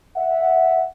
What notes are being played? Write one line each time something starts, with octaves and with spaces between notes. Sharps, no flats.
E5 F#5